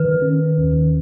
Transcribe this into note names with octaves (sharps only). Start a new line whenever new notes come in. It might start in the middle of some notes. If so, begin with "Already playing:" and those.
Already playing: D#3 B4
C#4
D#2